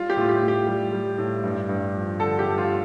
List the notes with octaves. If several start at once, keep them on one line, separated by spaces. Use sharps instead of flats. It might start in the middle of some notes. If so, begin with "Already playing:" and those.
Already playing: G3 F4
G4
A2 F4
G4
A2
G4
G3
G3
A2
G2
G2
F3
D3 A4
G4
G2
F4